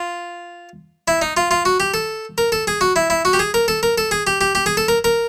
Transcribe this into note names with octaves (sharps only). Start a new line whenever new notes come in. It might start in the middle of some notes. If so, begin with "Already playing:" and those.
Already playing: F4
E4
D#4
F4
F4
F#4
G4
A4
A#4
A4
G#4
F#4
E4
E4
F#4
G4
G#4
A#4
A4
A#4
A4
G#4
G4
G4
G4
G#4
A4
A#4
A#4